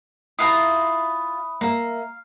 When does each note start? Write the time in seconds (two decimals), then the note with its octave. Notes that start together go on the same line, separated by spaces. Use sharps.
0.39 E4 F4 B4 E5 F5 A#5 D#6
1.61 A#3 E5 F5 A#5